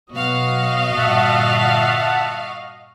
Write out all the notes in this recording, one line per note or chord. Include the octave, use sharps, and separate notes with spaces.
B2 F#3 B3 F#4 D#5 F5
G1 A#2 G3 E5 F#5 A5